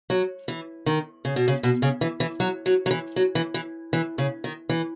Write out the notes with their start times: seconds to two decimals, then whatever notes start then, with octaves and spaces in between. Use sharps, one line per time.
0.10 F#3
0.48 E3
0.86 D#3
1.25 C#3
1.36 B2
1.48 C#3
1.63 B2
1.82 C#3
2.01 E3
2.20 E3
2.40 F#3
2.66 F#3
2.86 F#3
2.91 E3
3.16 F#3
3.35 E3
3.54 E3
3.93 E3
4.18 C#3
4.44 D#3
4.69 E3